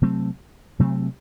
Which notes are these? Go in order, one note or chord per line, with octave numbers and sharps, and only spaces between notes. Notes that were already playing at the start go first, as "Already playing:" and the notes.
C3 F#3 A3 C4
C3 F#3 A3 C4